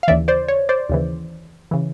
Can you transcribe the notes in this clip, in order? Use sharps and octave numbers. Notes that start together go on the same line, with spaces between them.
F5
D#2 C#3 E3 D5 E5
C5 D5
C#5
C5 D5
D#2 C#3 E3
C#3 E3